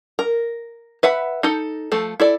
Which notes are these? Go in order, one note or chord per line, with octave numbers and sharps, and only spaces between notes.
A#4
B4 E5 F#5 B5
D#4 A4
F3 A3 A4
E4 A4 D5